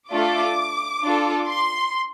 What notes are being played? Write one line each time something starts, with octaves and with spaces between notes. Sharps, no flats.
A3 D4 F4 A4 D6
D4 F4 A4
C6